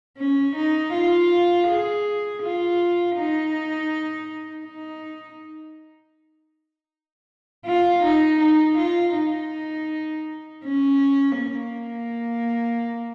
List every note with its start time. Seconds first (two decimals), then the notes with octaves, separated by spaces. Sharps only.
0.18 C#4
0.56 D#4
0.93 F4
1.68 G#4
2.42 F4
3.16 D#4
4.66 D#4
7.65 F4
8.03 D#4
8.40 D#4
8.78 F4
9.15 D#4
10.64 C#4
11.39 A#3